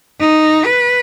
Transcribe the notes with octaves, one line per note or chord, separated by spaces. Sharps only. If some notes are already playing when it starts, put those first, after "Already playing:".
D#4
B4